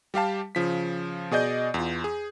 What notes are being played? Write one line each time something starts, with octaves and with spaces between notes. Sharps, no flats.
G3 G4 F5 A5
C#3 F3 B6
B2 G#4 D5 D#5 G6
E2 F4
G#4